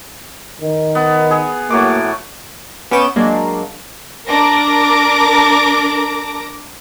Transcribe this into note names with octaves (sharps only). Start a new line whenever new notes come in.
D#3
B3
G#4
A2 F#3 A#3 D6
B3 C#4 E5 D6 G6 E7
F#3 G#3 A#3 D4
D4 A#4 D6 A#6